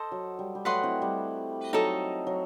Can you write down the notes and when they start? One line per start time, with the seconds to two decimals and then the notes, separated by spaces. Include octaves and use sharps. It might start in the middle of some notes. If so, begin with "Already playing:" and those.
Already playing: A4 C5 D#5
0.12 F#3
0.39 G3
0.55 G3
0.65 F#3 A3 B4 D#5 F#5 C6
0.83 C4 E4
1.02 G3
1.73 F#3 D#4 A4 D#5
2.27 F#3